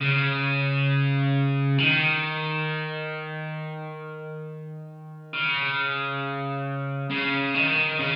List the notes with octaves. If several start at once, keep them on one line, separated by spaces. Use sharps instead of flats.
C#3
D#3
C#3
C#3
D#3
C#3